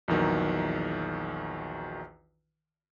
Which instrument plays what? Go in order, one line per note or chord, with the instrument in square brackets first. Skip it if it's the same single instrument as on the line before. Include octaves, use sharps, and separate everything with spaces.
[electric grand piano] A#1 E2 D#3 F#3